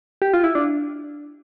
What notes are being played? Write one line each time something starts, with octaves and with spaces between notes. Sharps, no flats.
G4
F4
E4
D4